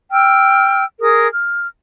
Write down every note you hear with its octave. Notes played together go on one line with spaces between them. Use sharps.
G5 E6 F6
G#4 A#4 D#6
F6